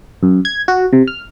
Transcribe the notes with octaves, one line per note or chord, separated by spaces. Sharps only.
F#2
G#6
F#4
C3
F6